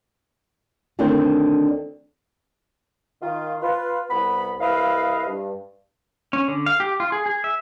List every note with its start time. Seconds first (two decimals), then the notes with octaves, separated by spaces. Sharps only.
0.99 D2 D3 D#3 C4 C5 C#5
3.22 D#3 F4
3.62 F4 B4
4.10 C2 B3 B5
4.60 C2 E4 B4 D#5 F5
5.26 G2
6.33 C#4
6.48 D3
6.66 F5
6.80 G4
7.00 F4
7.12 G#4
7.26 G#4
7.44 E5